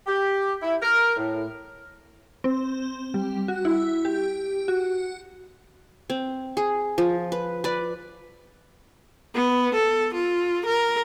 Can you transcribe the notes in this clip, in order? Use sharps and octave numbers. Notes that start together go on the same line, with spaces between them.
G4
E4
A#4
A2
C4
G3
F#4
E4
G4
F#4
C4
G#4
F3
B4
B4 D5
B3
A4
F4
A#4